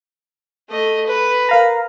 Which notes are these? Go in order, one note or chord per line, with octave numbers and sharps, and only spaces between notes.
A3 D#5
B4
A#4 F5 A#5